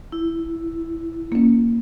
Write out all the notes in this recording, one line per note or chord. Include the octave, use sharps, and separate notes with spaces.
E4
A#3 C#4